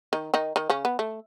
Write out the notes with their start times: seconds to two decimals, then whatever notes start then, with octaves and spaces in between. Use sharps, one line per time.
0.13 D#3 D#4
0.34 D#3 D#4
0.56 D#3 D#4
0.70 C#3 C#4
0.85 B3
0.99 A3